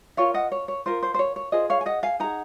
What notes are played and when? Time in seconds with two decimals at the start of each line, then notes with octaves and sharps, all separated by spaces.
0.17 F4 A#4 C#5 F5
0.34 D#5 F#5
0.52 C#5
0.68 C#5
0.86 F4 A#4 C5
1.03 C5
1.14 C5
1.19 C#5
1.36 C#5
1.52 F4 G#4 C5 D#5
1.70 C#5 F5
1.81 G#5
1.86 D#5 F#5
2.03 F5 G#5
2.20 D#4 G#4 F#5 A#5